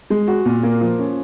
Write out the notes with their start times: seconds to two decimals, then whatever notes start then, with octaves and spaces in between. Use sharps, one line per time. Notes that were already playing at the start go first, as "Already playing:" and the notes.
0.10 G#3
0.28 F#4
0.46 A#2
0.63 A#3
0.81 F3
0.99 C#4